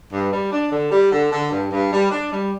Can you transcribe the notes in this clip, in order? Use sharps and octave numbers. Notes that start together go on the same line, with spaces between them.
G2
G3
D4
D3
G3
D3
D3
G2
G2
G3
D4
G3